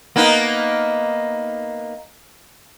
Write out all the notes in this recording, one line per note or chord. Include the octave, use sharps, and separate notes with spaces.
A#3 B3 D#4